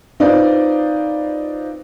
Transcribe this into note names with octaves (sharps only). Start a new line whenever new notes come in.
C4 D#4 F4 B4 C5 D5